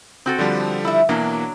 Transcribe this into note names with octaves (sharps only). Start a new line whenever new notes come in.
C4 F#4 A4
D3 F3 G3
E4 E5
B2 E3 F#3 A#3 D4